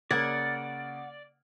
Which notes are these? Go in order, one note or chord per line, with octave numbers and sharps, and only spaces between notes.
C#3 A#3 D5 F#5 G#6